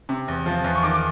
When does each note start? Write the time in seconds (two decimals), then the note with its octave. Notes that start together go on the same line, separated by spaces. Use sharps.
0.09 C3
0.28 E2
0.46 F3
0.64 E2
0.75 C#6
0.83 D#3 D6
0.94 D6